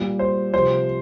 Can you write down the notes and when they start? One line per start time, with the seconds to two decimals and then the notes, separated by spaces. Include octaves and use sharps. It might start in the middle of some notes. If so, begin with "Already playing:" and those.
Already playing: A#2 G3
0.19 C5
0.53 C3 F3 C5